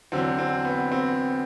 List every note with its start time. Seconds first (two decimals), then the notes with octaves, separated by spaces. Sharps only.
0.12 E2 D3 F#3 C4
0.39 C4
0.65 B3
0.92 C4